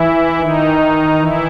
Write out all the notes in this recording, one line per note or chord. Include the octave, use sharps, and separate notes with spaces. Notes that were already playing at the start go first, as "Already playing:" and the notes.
Already playing: E3 E4
D#3 D#4
E3 E4